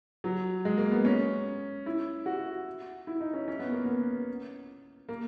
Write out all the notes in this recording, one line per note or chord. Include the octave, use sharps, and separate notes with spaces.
F#3
G#3
A#3
B3
C#4
E4
F#4
E4
D#4
C#4
C#4
B3
A#3
B3
A#3